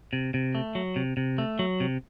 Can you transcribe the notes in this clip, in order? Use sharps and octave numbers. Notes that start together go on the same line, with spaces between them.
C3
C3
A3
F#3
C3
C3
A3
F#3
C3